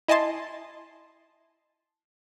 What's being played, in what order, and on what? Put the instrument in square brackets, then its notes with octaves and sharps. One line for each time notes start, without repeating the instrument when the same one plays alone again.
[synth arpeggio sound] E4 D#5 G#5 A5 C6